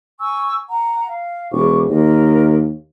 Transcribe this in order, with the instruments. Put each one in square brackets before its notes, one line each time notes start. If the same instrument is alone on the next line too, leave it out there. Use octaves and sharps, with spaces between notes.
[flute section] G#5 C#6 E6
F#5 A#5
F5
[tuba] E1 [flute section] C#6 D6
[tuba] D#2 [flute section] A#4 D#5